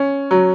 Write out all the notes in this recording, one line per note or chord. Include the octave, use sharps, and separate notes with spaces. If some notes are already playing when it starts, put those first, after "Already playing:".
Already playing: C#4
F#3